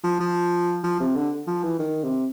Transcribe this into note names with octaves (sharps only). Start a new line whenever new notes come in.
F3
F3
F3
C3
D3
F3
E3
D#3
C3